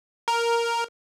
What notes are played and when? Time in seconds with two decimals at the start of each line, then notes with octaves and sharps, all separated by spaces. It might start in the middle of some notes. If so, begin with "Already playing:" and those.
0.28 A#4